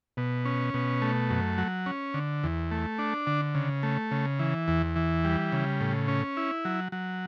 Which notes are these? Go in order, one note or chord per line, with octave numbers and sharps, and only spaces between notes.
B2
C#4
B2
A3
F#2
F#3
C#4
D3
E2
A3
D4
D3
C#3
A3
C#3
E3
E2
E3
G3
C#3
A2
C#4
E4
F#3
F#3